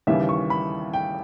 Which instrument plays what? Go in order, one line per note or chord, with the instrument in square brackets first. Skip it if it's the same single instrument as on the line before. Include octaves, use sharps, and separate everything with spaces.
[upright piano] D#2 C#3 E3 G3 E5
C#6
B5
G5